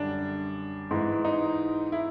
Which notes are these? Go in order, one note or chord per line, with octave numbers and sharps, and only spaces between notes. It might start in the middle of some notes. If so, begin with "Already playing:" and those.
Already playing: F#2 D3 G3 D4
G#2 E3 G#3
D#4
E4